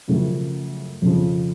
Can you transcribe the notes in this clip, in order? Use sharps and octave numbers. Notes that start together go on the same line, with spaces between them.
F#2 C#3 F3 A3
F2 C#3 F3